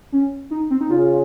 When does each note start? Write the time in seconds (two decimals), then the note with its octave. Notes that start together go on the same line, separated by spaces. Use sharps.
0.12 C#4
0.51 D#4
0.70 C4
0.81 D#4
0.90 C#3 F4